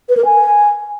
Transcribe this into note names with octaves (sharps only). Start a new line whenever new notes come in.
B4
A#4
G#5